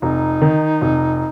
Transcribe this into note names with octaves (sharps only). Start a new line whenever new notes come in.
F1 D#4
D#3
F1